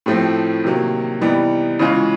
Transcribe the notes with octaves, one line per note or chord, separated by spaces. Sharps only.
A2 F3 A3 C4
C3 D#3 F#3 A#3
C3 E3 G3 B3 D#4
C#3 E3 G#3 C#4 F4